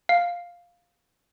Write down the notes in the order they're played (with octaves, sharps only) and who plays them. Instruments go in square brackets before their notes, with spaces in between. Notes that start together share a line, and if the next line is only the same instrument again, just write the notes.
[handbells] F5